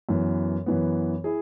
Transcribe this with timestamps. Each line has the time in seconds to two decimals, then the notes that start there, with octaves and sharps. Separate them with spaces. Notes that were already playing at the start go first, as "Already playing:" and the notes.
0.09 F#2 E3 B3
0.66 F#2 E3 B3
1.24 E4 G#4